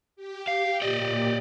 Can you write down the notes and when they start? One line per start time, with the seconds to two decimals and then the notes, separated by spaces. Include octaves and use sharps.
0.16 G4
0.47 F5
0.82 A#2 G4 D5 D#5